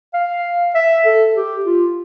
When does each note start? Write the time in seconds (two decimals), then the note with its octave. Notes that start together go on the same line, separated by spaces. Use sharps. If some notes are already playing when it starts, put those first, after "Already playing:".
0.14 F5
0.75 E5
1.05 A4
1.35 G4
1.66 F4